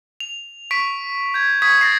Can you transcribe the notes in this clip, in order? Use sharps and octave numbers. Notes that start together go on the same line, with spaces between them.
F7
C#6 B6 D7
G6 G#6
C#6 D#6 G#6 B6
A6 A#6 C7